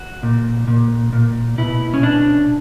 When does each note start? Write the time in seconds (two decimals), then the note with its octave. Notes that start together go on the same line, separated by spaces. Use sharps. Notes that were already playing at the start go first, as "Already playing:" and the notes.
Already playing: F#4
0.23 A#2
0.68 A#2
1.13 A#2
1.58 B2 E4
1.94 C#4
2.03 B2 D4